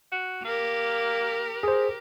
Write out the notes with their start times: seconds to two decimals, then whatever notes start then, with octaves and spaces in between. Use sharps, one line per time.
0.12 F#4
0.45 A#3 G4 A#4
1.63 G#4 C5